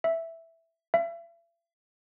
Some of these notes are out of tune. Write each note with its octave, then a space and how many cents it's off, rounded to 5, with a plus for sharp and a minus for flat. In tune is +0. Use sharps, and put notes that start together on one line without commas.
E5 +0
E5 +45